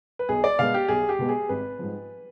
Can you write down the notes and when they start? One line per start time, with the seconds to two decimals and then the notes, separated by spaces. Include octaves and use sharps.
0.19 B4
0.29 B1 G#4
0.44 D5
0.59 B2 G#3 B3 F5
0.74 G4
0.89 B1 G#4
1.09 G4
1.19 B2 G#3 B3
1.29 G#4
1.49 G#1 B4
1.79 G#2 F3